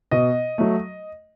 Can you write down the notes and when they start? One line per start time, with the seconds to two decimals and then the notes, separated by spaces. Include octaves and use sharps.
0.11 B2 D#5
0.58 F#3 A3